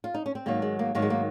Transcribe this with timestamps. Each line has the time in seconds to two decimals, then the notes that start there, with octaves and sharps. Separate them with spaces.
0.04 F4
0.14 D#4
0.26 C#4
0.35 C4
0.46 G#2 D#3 F#3 A#3
0.62 G#3
0.79 A#3
0.95 G#2 D#3 F#3 A#3
1.02 G#3
1.10 A#3